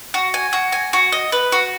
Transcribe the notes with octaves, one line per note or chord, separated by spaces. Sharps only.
F#4
G#5
F#4
G#5
F#4
D#5
B4
F#4